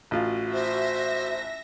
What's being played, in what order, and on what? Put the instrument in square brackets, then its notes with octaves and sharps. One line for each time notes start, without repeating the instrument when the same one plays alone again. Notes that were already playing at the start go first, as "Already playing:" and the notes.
[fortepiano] A1 F4 [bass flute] F#4
[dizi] C5 [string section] E5 A#6